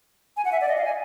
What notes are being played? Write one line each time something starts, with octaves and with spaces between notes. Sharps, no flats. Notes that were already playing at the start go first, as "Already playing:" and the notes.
G#5
F#5
E5
D5
D#5
F5
G#5